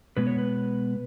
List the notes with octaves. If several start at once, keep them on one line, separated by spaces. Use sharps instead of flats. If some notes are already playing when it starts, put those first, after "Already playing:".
B2 G#3 B3 B4
C#5
B4